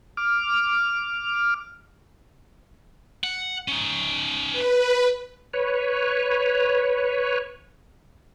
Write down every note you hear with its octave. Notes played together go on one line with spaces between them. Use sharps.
D6 F6
F#5
C#4 D#4
B4
B4 C#5